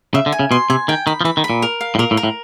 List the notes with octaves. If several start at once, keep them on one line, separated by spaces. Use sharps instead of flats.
C#3 E5
D3
G#5
C#3
B2 C6
C3 G#5
D#3 G5
D#3 B5
F3
E3 B5
D#3
B5
A#2
A#4
F5
A2
A#2 A#4
A2
A#4
A2